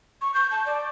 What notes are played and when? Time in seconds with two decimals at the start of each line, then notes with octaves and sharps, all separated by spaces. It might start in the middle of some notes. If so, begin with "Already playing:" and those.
0.21 C#6
0.34 G6
0.51 A5
0.66 D5